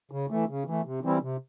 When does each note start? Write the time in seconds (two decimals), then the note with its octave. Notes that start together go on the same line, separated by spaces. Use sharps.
0.11 C#3
0.30 E3 A3
0.49 C#3
0.67 E3 A3
0.85 C3
1.03 E3 G3 C4 E4
1.22 C3